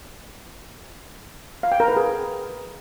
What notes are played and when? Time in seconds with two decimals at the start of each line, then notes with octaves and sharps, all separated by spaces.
1.63 F5
1.72 G5
1.80 A#4
1.88 B4
1.97 G#4